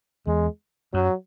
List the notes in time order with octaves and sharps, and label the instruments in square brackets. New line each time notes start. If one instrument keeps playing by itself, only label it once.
[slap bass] E2 [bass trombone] G#3
[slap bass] F#2 [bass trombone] F#3